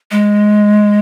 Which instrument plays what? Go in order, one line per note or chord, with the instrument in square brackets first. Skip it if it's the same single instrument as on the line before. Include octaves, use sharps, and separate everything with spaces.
[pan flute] G#3